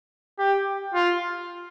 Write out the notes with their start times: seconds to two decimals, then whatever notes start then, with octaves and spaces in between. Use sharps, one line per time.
0.39 G4
0.94 F4